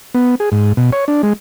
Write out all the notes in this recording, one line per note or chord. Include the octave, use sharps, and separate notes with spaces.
B3
G#4
G#2
B2
C#5
D4
G#3